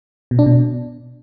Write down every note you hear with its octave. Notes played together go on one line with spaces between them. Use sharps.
B2
D4
B2